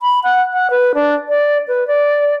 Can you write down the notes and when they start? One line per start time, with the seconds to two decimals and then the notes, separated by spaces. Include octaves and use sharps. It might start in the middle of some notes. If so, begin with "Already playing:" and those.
0.01 B5
0.24 F#5
0.53 F#5
0.70 B4
0.95 D4
1.29 D5
1.68 B4
1.88 D5